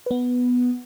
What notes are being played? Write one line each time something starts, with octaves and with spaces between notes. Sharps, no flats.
B3 B4